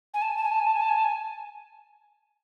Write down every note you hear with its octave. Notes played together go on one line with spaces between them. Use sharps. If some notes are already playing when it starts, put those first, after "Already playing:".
G#5
A5
G#5
A5
G#5
A5
G#5
A5
G#5
A5
G#5
A5
G#5